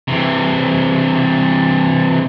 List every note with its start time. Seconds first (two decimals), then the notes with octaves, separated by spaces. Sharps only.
0.08 C3 E3